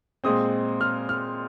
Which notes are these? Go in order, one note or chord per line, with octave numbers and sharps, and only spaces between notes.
A#2 G#3 C4 D#6
F6
F6